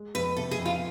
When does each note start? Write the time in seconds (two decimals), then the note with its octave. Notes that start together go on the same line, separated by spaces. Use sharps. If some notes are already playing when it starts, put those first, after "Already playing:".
Already playing: G#3
0.15 F2 B4
0.36 C3 A4
0.51 G#4
0.58 F2
0.66 F4